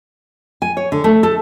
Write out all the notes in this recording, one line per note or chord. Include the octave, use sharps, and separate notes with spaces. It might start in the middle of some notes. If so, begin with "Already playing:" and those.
G#5
C#5
D3
A3
A4